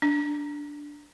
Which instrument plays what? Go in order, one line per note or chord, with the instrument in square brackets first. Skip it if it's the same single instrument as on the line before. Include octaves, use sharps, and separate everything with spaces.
[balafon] D4